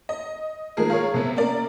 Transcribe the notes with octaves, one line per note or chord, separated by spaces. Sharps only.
D#5
D#3 F3 G#3 A#3 G#4 A#4
F4 G#4 A#4 C#5
C3 B3
A#3 C#4 A#4 D5